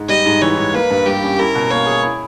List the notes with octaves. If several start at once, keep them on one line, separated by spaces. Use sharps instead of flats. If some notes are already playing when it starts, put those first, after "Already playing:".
Already playing: G#2
G3 D#5
G#2
E3 C#5
G#2
A#3 B4
G2
G3 G4
C#4
E4 A#4
B2
A#3 C#5
G#4
E4